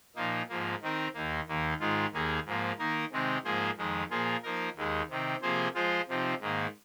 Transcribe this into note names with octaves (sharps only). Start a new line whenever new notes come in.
A#2 F3 A#3 D#4
G#2 F3 A#3
D#3 C4 D#4 A#4
D#2 D#3 A#3
D#2 D#3 A#3
G#2 D#3 G#3 F4
D#2 D#3 A#3 G#4
G#2 F3 A#3
D#3 A#3 D#4 A#4
C3 D#3 G#3 C4 D#4
G#2 F3 A#3 G#4 C5
F2 D#3 G#3 D#4
A#2 F3 A#3 F4 G#4
F3 A#3 D#4 A#4
D#2 D#3 G#3
C3 D#3 C4
C3 F3 A#3 G#4 C5
F3 G#3 F4 C5
C3 F3 C4 D#4
G#2 D#3 A#3